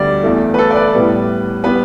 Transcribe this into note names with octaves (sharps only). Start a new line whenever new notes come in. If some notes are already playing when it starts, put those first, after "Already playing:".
Already playing: D2 G3 B3 D5
E2 E3 A3
B4
A4
D5
B4
A2 G3 B3
G3 B3 B4